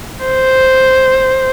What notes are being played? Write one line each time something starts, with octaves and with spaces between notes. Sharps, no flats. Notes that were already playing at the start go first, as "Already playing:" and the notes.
C5